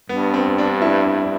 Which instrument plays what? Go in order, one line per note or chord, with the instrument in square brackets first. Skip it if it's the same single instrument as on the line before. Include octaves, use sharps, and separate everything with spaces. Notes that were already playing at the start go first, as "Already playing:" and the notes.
[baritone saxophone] G2 [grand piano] B3
[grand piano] C4
D4
E4